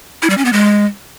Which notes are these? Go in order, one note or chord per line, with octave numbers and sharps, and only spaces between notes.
E4
G3
C#4
B3
G#3